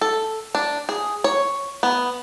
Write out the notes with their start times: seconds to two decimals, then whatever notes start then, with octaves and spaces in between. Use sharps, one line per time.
0.01 A4
0.55 D4
0.89 G#4
1.24 C#5
1.83 B3